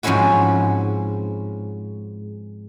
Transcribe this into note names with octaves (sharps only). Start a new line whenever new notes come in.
G#2 F3 C4 C#4 E4 F#4